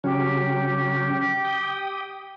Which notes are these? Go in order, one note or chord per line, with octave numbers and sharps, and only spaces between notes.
C#3 F#3 C#4 G4
G5 D#6